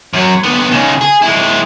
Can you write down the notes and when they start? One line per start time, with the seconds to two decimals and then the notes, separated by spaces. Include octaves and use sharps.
0.13 F#2 F#3
0.43 D3 B3
0.71 C#3 D#4
1.01 G#4
1.22 G#3 E4